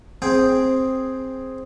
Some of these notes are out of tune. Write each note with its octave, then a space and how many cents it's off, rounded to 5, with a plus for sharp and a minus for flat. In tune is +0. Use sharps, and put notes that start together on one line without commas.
C4 +5 G#4 +0 G5 +0